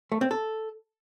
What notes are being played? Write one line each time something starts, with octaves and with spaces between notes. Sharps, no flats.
A3
C4
A4